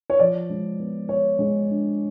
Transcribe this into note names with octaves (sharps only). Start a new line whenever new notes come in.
C#5
F3 D5
G#3
B3
B3 C#5
G#3
D4